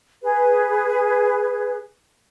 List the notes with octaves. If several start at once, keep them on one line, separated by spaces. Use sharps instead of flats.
G#4 B4